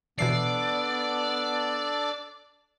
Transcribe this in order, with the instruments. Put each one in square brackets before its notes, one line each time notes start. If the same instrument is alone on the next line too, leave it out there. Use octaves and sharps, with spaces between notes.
[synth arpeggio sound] B2 E3 C7 [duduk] B3 [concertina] D4 A4 [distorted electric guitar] D5